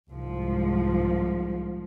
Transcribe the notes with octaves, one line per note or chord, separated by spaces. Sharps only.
C2 G#2 F3